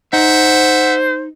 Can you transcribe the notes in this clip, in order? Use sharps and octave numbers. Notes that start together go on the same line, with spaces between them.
D#4 C5 E5 F#5